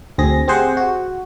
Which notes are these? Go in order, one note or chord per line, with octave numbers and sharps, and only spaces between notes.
D2 C4 G#4 A#6
C4 G4 G#4 C5 F#5
F#4